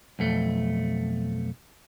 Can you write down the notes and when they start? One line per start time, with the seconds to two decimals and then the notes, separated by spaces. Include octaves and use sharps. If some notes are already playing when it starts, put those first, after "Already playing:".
0.19 B1 F2 A3